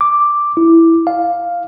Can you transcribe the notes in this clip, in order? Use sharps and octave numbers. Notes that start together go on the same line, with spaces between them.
D6
E4
F5